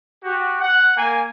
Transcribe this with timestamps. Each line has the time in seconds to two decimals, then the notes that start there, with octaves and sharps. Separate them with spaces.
0.24 F#4 G4
0.61 F#5
0.97 A#3 G#5